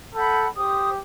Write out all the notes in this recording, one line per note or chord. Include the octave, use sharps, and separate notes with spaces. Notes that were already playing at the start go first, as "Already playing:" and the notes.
A4 F#5 B5 G6
G4 C5 D#6